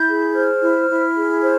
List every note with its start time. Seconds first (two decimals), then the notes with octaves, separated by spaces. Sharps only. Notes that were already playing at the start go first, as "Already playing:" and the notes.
Already playing: E4 G6
0.08 G#4
0.35 C5 F6
0.62 E4
0.89 E4
1.16 G#4
1.43 C5